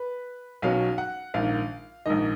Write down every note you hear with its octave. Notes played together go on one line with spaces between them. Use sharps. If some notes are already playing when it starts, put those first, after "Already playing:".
Already playing: B4
B1 B2 F#3 C#4 F5
F#5
A#1 G#2 D#3 F5
A#1 G#2 D#3 D#5